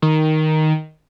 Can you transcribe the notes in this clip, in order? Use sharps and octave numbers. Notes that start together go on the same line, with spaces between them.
D#3